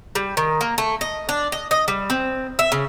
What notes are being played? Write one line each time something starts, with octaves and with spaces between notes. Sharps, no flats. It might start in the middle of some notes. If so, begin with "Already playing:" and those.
G3
D#3
A#3
A3
D#5
D4
D#5
D#5
G3
C4
E5
C#3